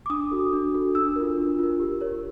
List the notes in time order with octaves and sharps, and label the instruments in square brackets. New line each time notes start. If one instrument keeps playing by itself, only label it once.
[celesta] D6
D4 D#6
F#4 A4
D4
F#4 A4
D4 E6
F4 A#4
D4
F4 A#4
G4
A#4 C#5